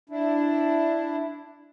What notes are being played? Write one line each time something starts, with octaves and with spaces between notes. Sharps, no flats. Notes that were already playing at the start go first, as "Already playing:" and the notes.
D4 E4